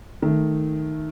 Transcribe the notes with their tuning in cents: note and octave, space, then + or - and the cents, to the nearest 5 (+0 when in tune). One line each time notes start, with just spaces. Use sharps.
D#3 +0 A3 -5